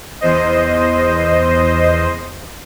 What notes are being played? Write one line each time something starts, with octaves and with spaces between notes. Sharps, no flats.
E2 C5 D#5